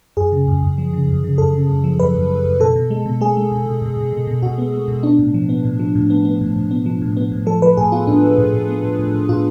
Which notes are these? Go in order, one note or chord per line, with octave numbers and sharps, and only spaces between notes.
F#2 G#4
C#3
F#2
F#2
F3
C#3
F#2
C#3
F#2 A4
C#3
F#2
F3
F#2 B4
F#2
F#2
F#2
B2 A4
B2
G#3
B2
G#3 G#4
G#3
B2
B2
B2
B2
B2
B2
B2 F#4
B3
B3
B2
B3 D4
A2
F3
B3
A2
F3
A2
B3
B3
A2
A2
B3
F3
A2
B3
A2
F3 A4
F3 B4
A2 G#4
B3 F4
A2 D4
F3
A2
A2
B3
A2
A2
A2
A2 F4